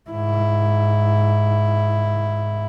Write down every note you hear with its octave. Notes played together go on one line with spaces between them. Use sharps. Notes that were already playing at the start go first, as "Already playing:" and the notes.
G#2 E4